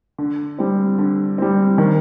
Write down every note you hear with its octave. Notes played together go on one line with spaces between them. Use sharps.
D3
G3 C4
D3
G3 C4
D#3